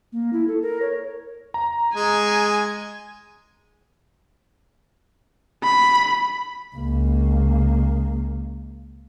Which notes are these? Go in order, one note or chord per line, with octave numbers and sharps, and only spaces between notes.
A#3
E4
A4
A#4
C#5
A#5
G#3 G#5
B5
C#2 A#3